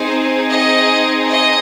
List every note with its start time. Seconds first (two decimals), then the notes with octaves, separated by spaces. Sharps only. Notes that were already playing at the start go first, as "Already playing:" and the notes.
Already playing: C4 D#4 G#4 C5
0.50 D#5
1.29 D#5